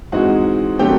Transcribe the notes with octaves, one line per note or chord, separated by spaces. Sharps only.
G#2 E3 G#3 C4 D#4 F#4 F#5
D#3 F#3 A3 C4 G4 G5